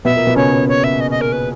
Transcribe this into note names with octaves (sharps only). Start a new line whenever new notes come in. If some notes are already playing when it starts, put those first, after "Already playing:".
B2 B3 E5
A#2 A#3
B2 B3
C#3 C#4 C#5
C#5
E5
D#5
D#5
A#4
B4